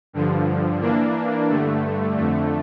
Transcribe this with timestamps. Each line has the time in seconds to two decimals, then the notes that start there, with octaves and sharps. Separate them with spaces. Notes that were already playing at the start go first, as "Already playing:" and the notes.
0.13 G2 D3 F3
0.81 E3 A#3 D4
1.49 G2 D3 A3
2.17 F2 D3 A3